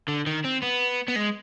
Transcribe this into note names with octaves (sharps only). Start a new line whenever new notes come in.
D3
D#3
C4
B3
B3
G#3